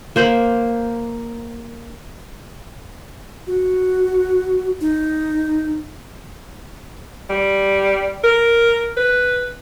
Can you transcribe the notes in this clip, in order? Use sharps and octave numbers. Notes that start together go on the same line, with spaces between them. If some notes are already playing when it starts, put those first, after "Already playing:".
A#3 C5 B5
F#4
D#4
G3
A#4
B4